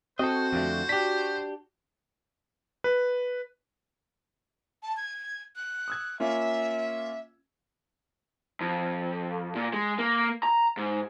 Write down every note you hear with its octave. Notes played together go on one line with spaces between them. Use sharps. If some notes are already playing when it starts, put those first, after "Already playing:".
C4 F#4 A4 C5 D#5
F2 D3 A3
D4 G4 B6
B4
A5
G#6
F#6
D#6 E6 G#6
A#3 C#4 F4 E5
F2
A#2
G#3
A#3
A#5
G#2